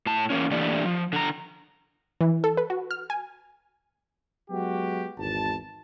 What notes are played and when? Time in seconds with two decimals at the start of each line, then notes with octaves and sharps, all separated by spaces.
0.06 A2 A5
0.30 E2 G#2 A#3 C#4
0.51 E3 A3 A#3 D4 G4 D5
0.85 F3
1.13 D3 A#5
2.21 E3
2.44 A4
2.57 B4
2.70 F#4
2.91 F6
3.10 G#5
4.51 F#3 G#3 B3 F#4 G4
5.18 G#1 E2 A5